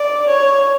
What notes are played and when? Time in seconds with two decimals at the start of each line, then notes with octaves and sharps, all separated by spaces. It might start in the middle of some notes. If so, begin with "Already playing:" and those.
Already playing: D5
0.27 C#5